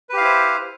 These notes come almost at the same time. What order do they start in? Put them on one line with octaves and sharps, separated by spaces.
B4 G4 F5 E4 C5